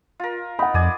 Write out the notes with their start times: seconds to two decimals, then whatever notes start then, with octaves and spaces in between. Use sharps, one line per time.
0.20 F4 A#4
0.59 D#4 F#5 B5
0.74 F2 D5 G#5 D#6